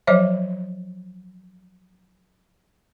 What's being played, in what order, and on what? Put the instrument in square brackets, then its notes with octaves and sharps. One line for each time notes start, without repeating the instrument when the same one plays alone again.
[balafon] F3 F#3 C5 C#5 D#5 E5